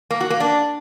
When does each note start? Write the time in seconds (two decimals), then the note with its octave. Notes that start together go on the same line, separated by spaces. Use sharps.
0.11 A#3
0.20 F#4
0.30 A#3
0.40 D4